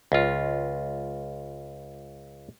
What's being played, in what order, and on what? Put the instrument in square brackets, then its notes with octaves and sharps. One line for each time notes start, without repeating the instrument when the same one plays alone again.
[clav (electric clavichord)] C#2 F4